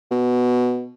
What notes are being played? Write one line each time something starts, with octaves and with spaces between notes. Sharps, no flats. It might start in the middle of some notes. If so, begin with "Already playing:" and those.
B2